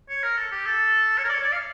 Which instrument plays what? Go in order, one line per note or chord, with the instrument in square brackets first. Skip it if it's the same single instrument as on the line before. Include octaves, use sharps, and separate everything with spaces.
[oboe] C#5
A#4
A4
G4
A4
C#5
A#4
D5
C#5
D5
F5